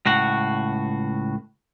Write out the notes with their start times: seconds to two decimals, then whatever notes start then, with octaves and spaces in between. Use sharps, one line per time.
0.06 C#2 A2 F#4